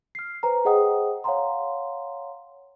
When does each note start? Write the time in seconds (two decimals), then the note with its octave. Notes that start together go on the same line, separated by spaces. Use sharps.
0.15 F6 C7
0.43 B4 C5 G#5 A#5
0.65 G#4 C5 D#5 F#5 G5 D#6
1.24 C#5 F5 F#5 G#5 A#5 C6